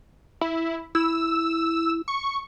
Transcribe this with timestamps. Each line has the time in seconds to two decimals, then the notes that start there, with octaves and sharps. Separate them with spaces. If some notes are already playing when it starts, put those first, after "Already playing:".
0.41 E4
0.95 E4 E6
2.08 C#6